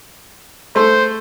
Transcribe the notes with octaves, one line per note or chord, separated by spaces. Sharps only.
A3 A4 C5